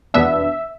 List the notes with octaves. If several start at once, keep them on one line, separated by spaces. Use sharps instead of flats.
E2 B2 B3 D4 E5